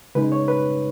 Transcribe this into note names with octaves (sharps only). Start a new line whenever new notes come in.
C#3 G#3 D#4 B4
C#5
B4